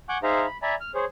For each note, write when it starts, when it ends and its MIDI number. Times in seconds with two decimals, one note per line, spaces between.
0.09 0.18 78
0.09 0.18 80
0.09 0.18 85
0.09 0.18 86
0.09 0.18 90
0.09 0.18 91
0.23 0.46 63
0.23 0.46 68
0.23 0.46 72
0.23 0.46 76
0.23 0.46 77
0.23 0.46 82
0.46 0.57 83
0.62 0.75 74
0.62 0.75 76
0.62 0.75 80
0.62 0.75 82
0.62 0.75 83
0.81 0.91 89
0.95 1.05 68
0.95 1.05 72
0.95 1.05 73